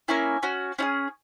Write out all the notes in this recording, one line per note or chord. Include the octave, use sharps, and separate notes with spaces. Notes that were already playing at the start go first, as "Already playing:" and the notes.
A#3 C#4 E4 G#5
C#4 F#4
C#4 E4 G#4